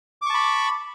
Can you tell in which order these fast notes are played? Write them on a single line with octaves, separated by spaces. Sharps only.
D6 C#6 A5 B5